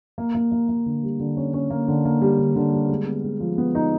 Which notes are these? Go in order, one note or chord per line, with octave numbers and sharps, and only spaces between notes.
A#3
A#3
A#3
A#3
D3
G3
D3
C#4
C#4
A#3
D3
A#3
G3
D3
D3
G3
G#3
B3
G#3
F3
B3
D#4